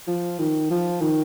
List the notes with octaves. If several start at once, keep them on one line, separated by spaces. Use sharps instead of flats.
F3
D#3
F3
D#3